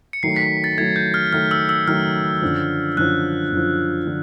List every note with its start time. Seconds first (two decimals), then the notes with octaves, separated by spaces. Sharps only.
0.13 C#7
0.23 D#3 F#3 A3 C7
0.36 B6
0.64 A6
0.78 D#3 F#3 A3 G#6
0.96 G6
1.14 F6
1.33 D#3 F#3 A3 F6
1.51 E6
1.69 E6
1.87 D#3 F#3 A3 F6
2.42 F#2 D3 F3
2.97 F#2 D3 F3 F#6
3.52 F#2 D3 F3
4.07 D3 F3